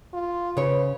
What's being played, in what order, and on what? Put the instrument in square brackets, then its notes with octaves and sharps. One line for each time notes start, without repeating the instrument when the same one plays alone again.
[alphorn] F4
[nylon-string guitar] C#3 C#5 [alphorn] B4